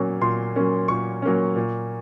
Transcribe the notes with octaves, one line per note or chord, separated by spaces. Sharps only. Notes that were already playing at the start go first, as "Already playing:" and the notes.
Already playing: A#2 F#3 A#3 C#4
A#2 C6
F#3 A#3 C#4
A#2 C#6
F#3 A#3 C#4
A#2